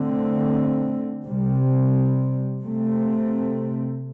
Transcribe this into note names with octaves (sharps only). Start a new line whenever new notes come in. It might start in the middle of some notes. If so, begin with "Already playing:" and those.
Already playing: D3 A3 C4
C3 G3 C4
C3 A3 C4